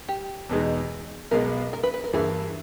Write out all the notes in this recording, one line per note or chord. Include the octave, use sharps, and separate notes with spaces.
G4
E2 B2 G#3 D#4
B1 B2 G#3 B3 A#4
A#4
B4
B4
A#4
G2 E3 A#3 E4 G#4